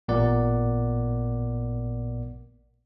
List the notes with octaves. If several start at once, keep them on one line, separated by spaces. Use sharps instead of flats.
A1 A#2 B3 A#4 D5 F#5